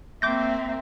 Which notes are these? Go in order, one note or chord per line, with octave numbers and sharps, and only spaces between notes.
A#3 C4 E5 D6 G6 A#6